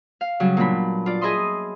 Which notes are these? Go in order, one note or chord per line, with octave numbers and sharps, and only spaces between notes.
F5
C#3 F#3 G3
A#2 B3 D4 B5
F4 D5
G#4 D#5 E5 B5 C6 D#6